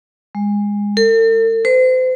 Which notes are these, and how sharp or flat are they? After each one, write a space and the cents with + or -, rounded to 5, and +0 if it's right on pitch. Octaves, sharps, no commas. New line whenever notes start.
G#3 -20
A4 +45
C5 -35